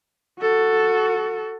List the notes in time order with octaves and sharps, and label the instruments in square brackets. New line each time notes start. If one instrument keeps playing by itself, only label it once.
[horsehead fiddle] F#4 A4